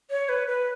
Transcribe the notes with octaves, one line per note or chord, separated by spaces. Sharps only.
C#5
B4
B4